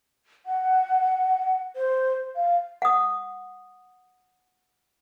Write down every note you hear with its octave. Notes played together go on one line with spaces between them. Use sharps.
F#5
C5
F5
F#5 D#6